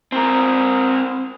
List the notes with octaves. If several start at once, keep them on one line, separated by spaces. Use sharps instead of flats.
C4 A#4